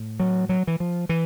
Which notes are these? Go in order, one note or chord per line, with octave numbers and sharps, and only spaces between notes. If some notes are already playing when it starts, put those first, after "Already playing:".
Already playing: A2
F#3
F#3
E3
F3
E3